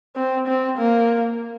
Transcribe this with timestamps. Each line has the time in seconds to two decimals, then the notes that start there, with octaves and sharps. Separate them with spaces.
0.16 C4
0.48 C4
0.78 A#3